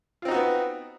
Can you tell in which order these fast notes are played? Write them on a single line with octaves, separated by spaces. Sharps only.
F4 C4 D#4 F#4 B3